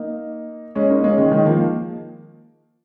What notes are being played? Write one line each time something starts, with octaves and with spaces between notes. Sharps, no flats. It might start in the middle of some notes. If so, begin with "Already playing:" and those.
Already playing: A#3 D#4
G#3 C#4
A#3 D#4
G#3 C#4
D#3 G#3
D#3 G#3
F3 A#3